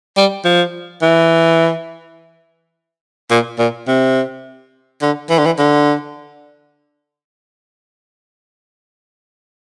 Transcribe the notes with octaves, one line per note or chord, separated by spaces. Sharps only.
G3
F3
E3
A#2
A#2
C3
D3
E3
D3
E3
D3